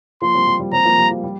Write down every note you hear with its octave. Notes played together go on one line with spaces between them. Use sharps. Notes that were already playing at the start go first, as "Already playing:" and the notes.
F3 A#3 C6
G3 C4
G3
G3
G3 C4 A#5
F3 A#3
G3
F3
G3